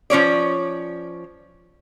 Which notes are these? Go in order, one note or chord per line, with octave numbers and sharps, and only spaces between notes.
F3 C#4 C#5 D5